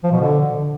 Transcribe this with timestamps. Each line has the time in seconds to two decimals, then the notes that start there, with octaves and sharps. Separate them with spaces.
0.04 F3
0.12 B2
0.20 D3